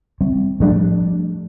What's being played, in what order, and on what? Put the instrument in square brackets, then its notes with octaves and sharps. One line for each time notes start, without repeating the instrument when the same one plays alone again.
[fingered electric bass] G3 C4
[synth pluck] A2 G3 D4 [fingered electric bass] F3 A3